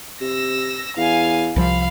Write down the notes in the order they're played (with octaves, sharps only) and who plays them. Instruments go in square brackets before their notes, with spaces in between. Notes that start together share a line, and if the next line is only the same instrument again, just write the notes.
[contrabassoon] C3 [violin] E6 A#6
[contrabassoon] E2 [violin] F5 G#5
[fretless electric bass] C2 F3 [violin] F5 B5